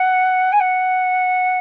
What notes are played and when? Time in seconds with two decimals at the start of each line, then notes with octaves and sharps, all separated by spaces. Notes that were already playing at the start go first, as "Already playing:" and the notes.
Already playing: F#5
0.52 G#5
0.60 F#5